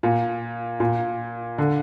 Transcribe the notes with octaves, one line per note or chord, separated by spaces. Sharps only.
A#2
A#2
D3